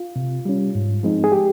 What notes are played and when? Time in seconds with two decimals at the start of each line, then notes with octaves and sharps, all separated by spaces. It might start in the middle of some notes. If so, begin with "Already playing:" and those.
Already playing: F4
0.16 C3
0.45 G3 C#4
0.75 G#2
1.03 F3 G#3 C4 D#4
1.24 G#4
1.32 G4